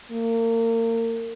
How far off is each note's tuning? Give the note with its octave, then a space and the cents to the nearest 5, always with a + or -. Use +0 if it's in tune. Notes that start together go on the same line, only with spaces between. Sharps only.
A#3 -35